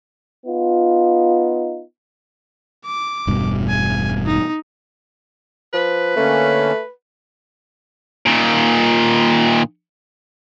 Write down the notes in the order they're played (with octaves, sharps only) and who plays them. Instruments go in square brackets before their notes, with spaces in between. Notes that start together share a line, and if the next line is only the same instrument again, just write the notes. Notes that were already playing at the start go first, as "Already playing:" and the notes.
[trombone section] B3 D#4 F4
[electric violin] D6
[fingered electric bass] E1 G2 B2
[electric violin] G#5
D#4
[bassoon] F3 [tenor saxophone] B4
[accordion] D3 A#3 C#4 [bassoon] A3
[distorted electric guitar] A#2 D#3